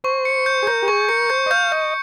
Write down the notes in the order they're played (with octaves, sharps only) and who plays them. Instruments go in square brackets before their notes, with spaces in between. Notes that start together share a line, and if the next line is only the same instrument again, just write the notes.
[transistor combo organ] C5 [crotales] C#6
[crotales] C#7
G6
[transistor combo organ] G#4
[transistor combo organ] A#4 [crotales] G6
[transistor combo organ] G4
[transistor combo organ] G#4 [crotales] C#6
[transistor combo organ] A#4 [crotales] C#7
[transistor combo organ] C5 [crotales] G6
[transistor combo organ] D#5
[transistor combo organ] F5 [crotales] G6
[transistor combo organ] D#5 [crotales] G6